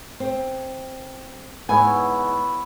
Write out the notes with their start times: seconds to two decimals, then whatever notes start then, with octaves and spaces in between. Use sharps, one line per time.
0.20 C4
1.69 G#2 B3 E4 C#5 G#5